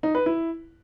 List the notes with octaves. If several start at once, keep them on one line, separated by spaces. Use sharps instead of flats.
D#4
B4
E4